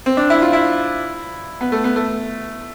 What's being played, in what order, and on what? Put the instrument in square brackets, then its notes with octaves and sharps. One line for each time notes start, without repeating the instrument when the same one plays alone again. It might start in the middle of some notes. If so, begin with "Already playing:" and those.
[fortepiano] C4
D4
E4
F4
E4
B3
A3
B3
A3